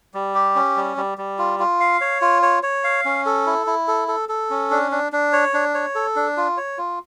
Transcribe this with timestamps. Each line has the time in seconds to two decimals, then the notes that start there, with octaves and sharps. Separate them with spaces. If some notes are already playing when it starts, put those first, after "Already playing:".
0.14 G3
0.35 G4
0.56 C#4
0.76 G3
0.97 G3
1.18 G3
1.39 F4
1.59 F4
1.80 F5
2.01 C#5
2.22 F4
2.42 C#5
2.63 C#5
2.84 F5
3.05 C#4
3.26 A4
3.46 E4
3.67 E4
3.88 A4
4.08 A4
4.29 A4
4.50 C#4
4.71 D4
4.92 D4
5.12 D4
5.33 C#5
5.54 D4
5.74 C#5
5.95 A4
6.16 D4
6.37 F4
6.57 C#5
6.78 F4